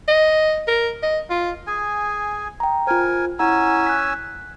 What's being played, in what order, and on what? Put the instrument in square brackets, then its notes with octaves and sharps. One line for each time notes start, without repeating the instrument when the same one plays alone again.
[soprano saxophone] D#5
A#4
D#5
F4
[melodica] G#4 G#5
[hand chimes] G5 A#5
[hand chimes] F4 C5 [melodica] A#4 G#5
[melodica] C#4 G#5 E6 [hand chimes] E4 F#5 A#5
[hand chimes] F#6 B6